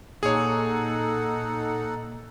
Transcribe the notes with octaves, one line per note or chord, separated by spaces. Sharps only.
A#2 D#4 G#4 A4 C#5 F#5